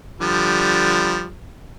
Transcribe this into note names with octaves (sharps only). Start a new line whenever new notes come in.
D3 F3 G3